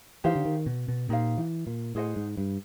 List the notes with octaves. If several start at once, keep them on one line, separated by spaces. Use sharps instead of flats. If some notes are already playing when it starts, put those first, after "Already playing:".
E3 D#4 G4 C5 F5
D3
D#3
B2
B2
A#2 D#4 G4 C5 F5
E3
A#2
A2 G#4 C5 D#5 F#5
G#2
G2